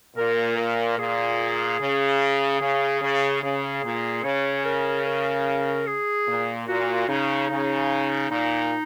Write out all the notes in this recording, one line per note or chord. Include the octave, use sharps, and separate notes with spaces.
A#2 A#4
A#4
A#2 G#4
C#3
C#3
C#3
C#3 G#4
A#2
C#3 C#5
A#4
A#4
G#4
A#2
A#2 F#4
C#3 D#4
C#3
A#2 D#4